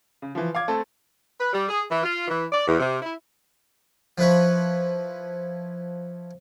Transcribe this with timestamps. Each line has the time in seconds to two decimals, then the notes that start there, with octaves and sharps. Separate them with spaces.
0.22 C#3
0.35 E3 F3
0.55 F5 D6 G#6
0.68 A3 C4 A4
1.40 B4
1.53 G3
1.69 G#4
1.90 E3
2.04 F4
2.28 E3
2.52 D5
2.67 E2
2.80 C3
3.02 E4
4.18 F3 E4 B4 C#5